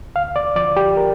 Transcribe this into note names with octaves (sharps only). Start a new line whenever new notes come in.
D2 F5
D5
D3 F3 D5
G4
A#4